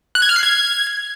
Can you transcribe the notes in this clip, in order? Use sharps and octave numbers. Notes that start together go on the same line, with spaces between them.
F#6
G#6
F6
C7
G#6